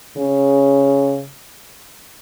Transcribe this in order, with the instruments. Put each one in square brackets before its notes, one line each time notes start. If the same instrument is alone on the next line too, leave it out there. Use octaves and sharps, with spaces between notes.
[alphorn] C#3